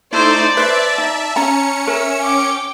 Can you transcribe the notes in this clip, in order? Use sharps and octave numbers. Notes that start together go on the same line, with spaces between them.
A3 D#4 E4 C5 D5
B4 C5 E5 A5
D#4
C#4 A#5 C#7
A#4 E5
G5 D6